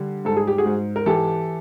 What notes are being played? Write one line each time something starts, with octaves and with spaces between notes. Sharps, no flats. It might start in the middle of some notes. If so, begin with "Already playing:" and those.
Already playing: D3 G3
G#2 A4
G#4
G4
F#4 G#4
G#2
A#4
E3 G4 A4